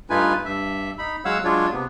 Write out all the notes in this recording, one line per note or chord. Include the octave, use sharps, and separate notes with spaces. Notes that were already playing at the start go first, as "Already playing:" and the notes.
G2 A3 D#4 F4 B4 G#5
G2 E5
D#4 B5
F#3 G#3 C#5 F5 F#5 E6
F#3 G#3 D4 F4 C#5
C3 B3